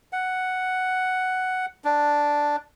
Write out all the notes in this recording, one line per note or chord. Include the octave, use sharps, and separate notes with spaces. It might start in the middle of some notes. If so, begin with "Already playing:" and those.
F#5
D4